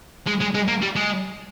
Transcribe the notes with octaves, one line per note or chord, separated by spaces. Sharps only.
G#3
G#3
G#3
A#3
G3
G#3